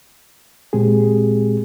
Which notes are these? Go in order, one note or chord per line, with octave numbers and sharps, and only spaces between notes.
A#2 G#3 C4 G4 G#4